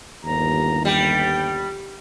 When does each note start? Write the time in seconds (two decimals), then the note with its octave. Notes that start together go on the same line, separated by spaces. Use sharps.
0.24 G1 D#2 A#5
0.85 G3 G5